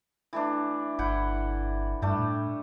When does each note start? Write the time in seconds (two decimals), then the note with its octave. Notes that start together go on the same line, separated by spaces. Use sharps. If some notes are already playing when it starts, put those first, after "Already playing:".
0.33 E3 A3 D4
0.99 G1 E4 F#5 G5
2.02 G2 G3 A3 D4
2.19 A2